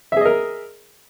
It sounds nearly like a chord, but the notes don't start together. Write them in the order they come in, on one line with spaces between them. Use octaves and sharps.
E5 G#4 D#5 A#4